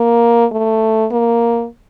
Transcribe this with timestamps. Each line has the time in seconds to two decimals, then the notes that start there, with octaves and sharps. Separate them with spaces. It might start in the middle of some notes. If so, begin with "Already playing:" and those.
Already playing: A#3
0.52 A3
1.11 A#3